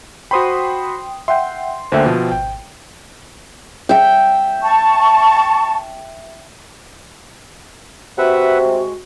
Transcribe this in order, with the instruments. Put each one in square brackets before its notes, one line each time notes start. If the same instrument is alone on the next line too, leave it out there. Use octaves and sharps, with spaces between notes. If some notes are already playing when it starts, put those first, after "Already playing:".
[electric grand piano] F#4 C5 B5 [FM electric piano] G5 C6 D#6
[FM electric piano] E5 F#5 G5 [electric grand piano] C6
[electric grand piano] D2 D3 A#3 [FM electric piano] C5 E5 G5
[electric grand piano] B2 F3
[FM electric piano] G#1 [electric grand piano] G5
[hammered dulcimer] E5 G5
[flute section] A5 C#6
[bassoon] C3 [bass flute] F#4 [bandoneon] B4 E5 F#5
[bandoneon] G#3